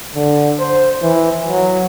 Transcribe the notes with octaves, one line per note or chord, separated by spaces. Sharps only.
D3
C5
E3
F#3